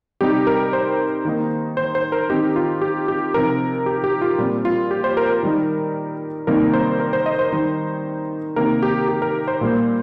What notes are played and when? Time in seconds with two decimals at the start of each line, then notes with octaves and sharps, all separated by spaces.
0.21 C3 G3 C4 D#4 G4
0.47 A#4
0.73 C5
1.25 D#3 A#3 D#4
1.77 C5
1.95 C5
2.12 A#4
2.30 D#3 C4 D#4 G4
2.56 F4
2.81 G4
3.08 G4
3.34 C3 F3 D#4 A#4
3.86 G4
4.04 G4
4.21 F4
4.38 A#2 G3 C4
4.65 F4
4.91 G4
5.04 C5
5.17 A#4
5.29 A#4
5.43 D#3 G3 D#4
6.47 C3 D#3 G3 A#3 D#4 A#4
6.73 C5
7.00 A#4
7.13 C5
7.26 D#5
7.39 C5
7.52 D#3 G3 D#4
8.56 C3 D#3 A#3 D#4 A#4
8.83 G4
9.08 G4
9.22 A#4
9.48 C5
9.61 A#2 G3 A#3